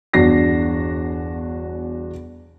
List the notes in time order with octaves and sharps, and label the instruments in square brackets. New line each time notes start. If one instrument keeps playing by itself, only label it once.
[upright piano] G1 E2 D4 F#4 A#6 C7